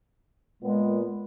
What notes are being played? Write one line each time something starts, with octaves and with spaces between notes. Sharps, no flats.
A#2 G#3 B3